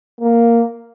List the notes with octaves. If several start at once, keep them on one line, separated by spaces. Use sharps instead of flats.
A#3